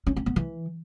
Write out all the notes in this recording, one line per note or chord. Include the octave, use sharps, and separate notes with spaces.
C#4
C4
B3
E3